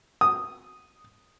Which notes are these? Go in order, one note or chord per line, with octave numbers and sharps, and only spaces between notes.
D#6